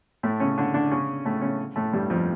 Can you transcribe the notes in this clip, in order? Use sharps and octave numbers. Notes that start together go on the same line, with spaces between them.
A2 A3
C#3 C#4
D3 D4
D3 D4
C#3 C#4
A2 A3
C#3 C#4
A2 A3
G2 G3
F2 F3